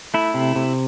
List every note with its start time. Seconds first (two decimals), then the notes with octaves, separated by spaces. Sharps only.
0.14 A3 E4
0.34 C3
0.56 C3